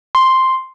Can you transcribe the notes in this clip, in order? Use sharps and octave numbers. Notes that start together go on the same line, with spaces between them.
C6